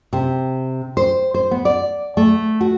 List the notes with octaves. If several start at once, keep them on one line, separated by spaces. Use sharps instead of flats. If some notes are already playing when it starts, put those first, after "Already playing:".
C3
C5
C5
B3
D5
A3
F#4